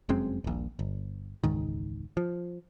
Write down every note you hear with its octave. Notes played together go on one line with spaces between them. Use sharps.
F1 F#2 G#3 C4
D#1 A#1
G1
E1 C#2 G#2 D#3
F3